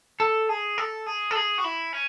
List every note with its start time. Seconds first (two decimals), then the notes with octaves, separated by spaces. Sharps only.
0.20 A4
0.49 G#4
0.78 A4
1.06 G#4
1.31 A4
1.35 G#4
1.58 F#4
1.64 E4
1.93 C#4